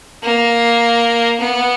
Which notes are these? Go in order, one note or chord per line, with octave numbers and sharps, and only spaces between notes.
A#3
B3